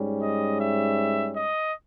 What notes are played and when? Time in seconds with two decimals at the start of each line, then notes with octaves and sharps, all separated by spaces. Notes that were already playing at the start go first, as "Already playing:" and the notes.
Already playing: G#2 G3 C#4
0.20 D#5
0.60 E5
1.36 D#5